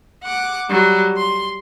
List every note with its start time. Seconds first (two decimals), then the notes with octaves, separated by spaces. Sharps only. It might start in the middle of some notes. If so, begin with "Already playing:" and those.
0.23 F#5 D6
0.69 F#3 G3
1.17 C6